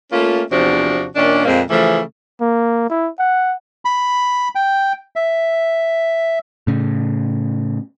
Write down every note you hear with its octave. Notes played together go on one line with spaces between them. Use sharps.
A3 A#3 C#4 F4
E2 C3 F3 D4 F#4
A#2 D#3 C#4 D4
F2 A#2 G#3 A#3 C4
C#3 E3 F3 A3
A#3
E4
F#5
B5
G5
E5
A2 C#3